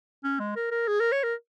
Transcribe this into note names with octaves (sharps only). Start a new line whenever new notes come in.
C#4
G#3
A#4
A#4
G#4
A#4
C#5
A#4